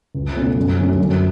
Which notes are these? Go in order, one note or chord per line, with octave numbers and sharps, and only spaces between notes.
C#2
B2 A3 C#4
F#2
D3 F#3 A3 C#4
F#2